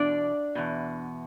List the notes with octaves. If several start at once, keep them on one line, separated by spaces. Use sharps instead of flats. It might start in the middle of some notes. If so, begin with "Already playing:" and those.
Already playing: E2 B2 D4 D5
E2 B2